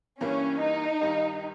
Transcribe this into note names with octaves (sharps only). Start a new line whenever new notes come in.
G2 E3 G3 A#3 C#4
D#4
G2 D#3 G3